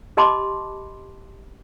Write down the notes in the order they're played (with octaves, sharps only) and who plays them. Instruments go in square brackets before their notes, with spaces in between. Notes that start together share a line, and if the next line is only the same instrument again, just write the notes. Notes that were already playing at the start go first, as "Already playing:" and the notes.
[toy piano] G4 D#5 A5 B5 C6 D6